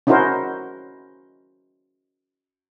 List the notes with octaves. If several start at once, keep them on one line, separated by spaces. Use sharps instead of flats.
C#4 D#4 E4 F#4 A#4 C5